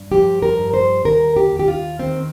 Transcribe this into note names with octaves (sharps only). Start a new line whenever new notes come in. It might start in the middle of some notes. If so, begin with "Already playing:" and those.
Already playing: G2
F3 G4
A#4
G2
C5
D#2 A#4
G4
D#2
G4
F4
D#3 C4